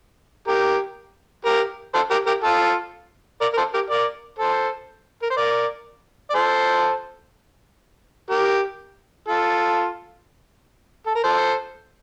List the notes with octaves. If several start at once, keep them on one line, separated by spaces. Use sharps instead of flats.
G4 A#4
G4 A#4
A4 C5
G4 A#4
G4 A#4
F4 A4
A#4 D5
A#4
A4 C5
G4 A#4
A#4 D5
A4 C5
A#4
C5
A#4 D5
D5
A4 C5
G4 A#4
F4 A4
A4
A#4
A4 C5